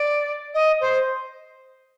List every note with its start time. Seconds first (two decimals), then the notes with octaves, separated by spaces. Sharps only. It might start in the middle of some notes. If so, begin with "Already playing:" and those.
Already playing: D5
0.54 D#5
0.81 C5